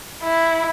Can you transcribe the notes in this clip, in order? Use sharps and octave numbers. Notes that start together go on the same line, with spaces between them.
E4